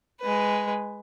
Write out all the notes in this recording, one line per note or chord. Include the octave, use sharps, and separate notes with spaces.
G#3 B4